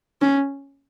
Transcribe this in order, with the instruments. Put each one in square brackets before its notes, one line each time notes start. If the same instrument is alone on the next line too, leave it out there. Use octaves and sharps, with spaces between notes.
[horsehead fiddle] C#4